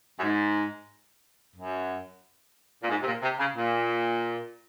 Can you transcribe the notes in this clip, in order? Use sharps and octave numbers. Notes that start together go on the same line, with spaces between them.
F#2
G#2
F#2
A#2
G#2
C3
A#2
C3
C#3
A#2